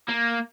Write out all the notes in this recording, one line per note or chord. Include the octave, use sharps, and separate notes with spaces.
A#3